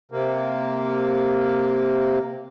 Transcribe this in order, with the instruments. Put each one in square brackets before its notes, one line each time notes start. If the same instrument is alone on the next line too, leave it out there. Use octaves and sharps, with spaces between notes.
[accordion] C3 A#3